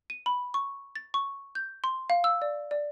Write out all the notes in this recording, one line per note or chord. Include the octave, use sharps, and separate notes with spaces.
D#7
B5
C#6
A6
C#6
G6
C6
F5
E6
D5
D5